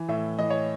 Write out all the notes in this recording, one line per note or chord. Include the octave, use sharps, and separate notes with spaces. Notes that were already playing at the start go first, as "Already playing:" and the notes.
Already playing: E3
A2 E5
E3 D#5
C#5